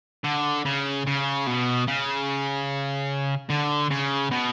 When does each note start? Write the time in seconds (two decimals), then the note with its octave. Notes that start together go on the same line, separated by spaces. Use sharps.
0.24 D3
0.65 C#3
1.07 C#3
1.46 B2
1.88 C#3
3.50 D3
3.91 C#3
4.31 B2